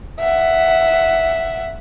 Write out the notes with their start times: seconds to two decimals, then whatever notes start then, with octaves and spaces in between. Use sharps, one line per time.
0.20 E5 F#5